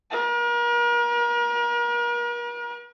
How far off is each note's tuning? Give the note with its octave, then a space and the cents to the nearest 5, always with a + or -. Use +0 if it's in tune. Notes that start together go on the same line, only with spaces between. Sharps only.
A#4 +40